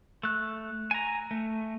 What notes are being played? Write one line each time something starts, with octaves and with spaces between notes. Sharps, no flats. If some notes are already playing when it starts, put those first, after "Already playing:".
A3 F#6
G#5 A#5
A3